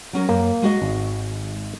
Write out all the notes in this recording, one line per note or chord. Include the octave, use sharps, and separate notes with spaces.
F#3 C#4 A#4
F#2 A#3
G#3 F#4 D#5
G#1